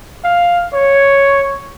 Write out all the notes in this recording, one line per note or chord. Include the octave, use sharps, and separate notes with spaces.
F5
C#5